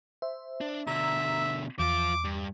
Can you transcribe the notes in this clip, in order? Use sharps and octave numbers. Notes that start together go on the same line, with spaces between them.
C5 E5
D4
B2 D3 E5 A#5 E6
E2 F3 F4 D6
G2